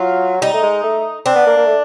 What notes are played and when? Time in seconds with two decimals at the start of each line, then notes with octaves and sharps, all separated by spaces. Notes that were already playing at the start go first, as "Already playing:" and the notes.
Already playing: F#3 F4
0.41 G3 D#4
0.53 A3
0.63 G#3
0.84 A3
1.26 C4 D4
1.36 B3
1.46 A#3
1.57 A#3
1.66 A3